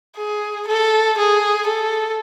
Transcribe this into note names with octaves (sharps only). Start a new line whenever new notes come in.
G#4
A4
G#4
A4